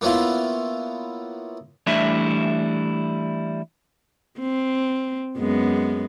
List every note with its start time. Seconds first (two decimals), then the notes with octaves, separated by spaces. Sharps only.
0.01 A#3 B3 C#4 E4 F4
1.87 E3 G3 A3 D4 E4 E5
4.40 C4
5.38 F#2 G#3 B3